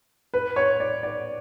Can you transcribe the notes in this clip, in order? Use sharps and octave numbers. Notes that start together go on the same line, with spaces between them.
B4
C#5
D5
D5